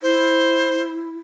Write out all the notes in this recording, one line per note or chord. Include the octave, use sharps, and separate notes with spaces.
E4 C5